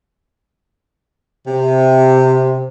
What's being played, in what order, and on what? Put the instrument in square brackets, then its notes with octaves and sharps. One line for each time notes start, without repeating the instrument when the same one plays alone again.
[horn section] C3